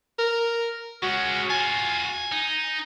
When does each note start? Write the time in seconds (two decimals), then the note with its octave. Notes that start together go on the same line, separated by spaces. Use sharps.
0.19 A#4
1.03 G#3 C#4 F#4
1.50 F4 F#4 G#5
2.32 D#4